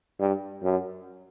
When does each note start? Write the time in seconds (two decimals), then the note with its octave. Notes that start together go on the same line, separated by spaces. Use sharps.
0.19 G2
0.63 F#2